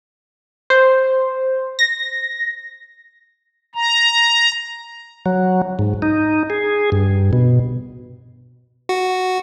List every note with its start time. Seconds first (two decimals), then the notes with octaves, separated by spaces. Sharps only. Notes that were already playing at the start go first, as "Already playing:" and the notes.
0.70 C5
1.79 A#6
3.75 A#5
5.26 F#3
5.79 G#2
6.02 D#4
6.50 G#4
6.92 G2
7.33 B2
8.89 F#4